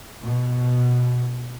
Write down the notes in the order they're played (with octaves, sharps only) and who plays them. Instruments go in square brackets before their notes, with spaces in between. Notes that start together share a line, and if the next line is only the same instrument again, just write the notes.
[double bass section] B2